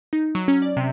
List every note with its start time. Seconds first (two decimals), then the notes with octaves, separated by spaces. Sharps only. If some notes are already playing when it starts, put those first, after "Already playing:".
0.13 D#4
0.35 F#3
0.48 C#4
0.62 D5
0.77 C3